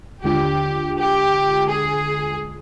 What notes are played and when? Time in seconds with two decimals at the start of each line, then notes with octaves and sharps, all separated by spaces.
0.24 D#2 D3 G#3 D4 F4 G4
0.97 G4
1.69 G#4